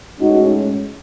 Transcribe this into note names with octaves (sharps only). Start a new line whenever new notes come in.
A2 G#3 C#4 D#4 F#4